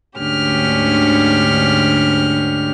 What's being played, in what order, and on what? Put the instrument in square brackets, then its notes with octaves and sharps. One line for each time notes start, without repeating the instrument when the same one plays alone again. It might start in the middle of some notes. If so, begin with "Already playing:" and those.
[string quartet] D2 G#2 D3 C#4 G4 F6